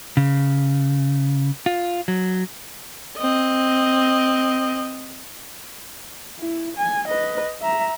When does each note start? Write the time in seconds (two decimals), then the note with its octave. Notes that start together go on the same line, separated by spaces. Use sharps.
0.17 C#3
1.66 F4
2.08 F#3
3.18 C4 D#5
6.39 E4
6.77 G#5
7.08 B4 D#5
7.61 E5 A#5